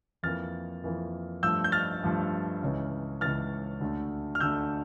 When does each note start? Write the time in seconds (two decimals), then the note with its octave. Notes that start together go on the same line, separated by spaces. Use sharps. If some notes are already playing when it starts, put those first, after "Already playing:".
0.23 F2 E3 A#3 F6 A6
0.84 F2 E3 A#3
1.43 G2 F3 A3 E6 G6
1.64 G6
1.72 F6 A6
2.03 G2 F3 A3
2.62 C#2 C#3 E3
3.21 C#2 C#3 E3 F6 A6
3.81 D2 D3 A3
4.35 F6
4.40 D2 D3 A3 E6 G6